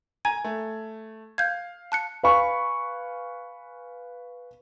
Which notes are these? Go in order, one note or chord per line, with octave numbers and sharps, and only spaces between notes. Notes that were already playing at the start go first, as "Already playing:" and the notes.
G#5 A#5 G#6
A3
F5 G6 G#6
A5 F#6 C#7
B4 F5 G#5 B5 C#6